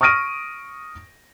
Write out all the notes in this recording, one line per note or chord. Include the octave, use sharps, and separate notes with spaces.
C#6 D#6 F6 A#6 D7 D#7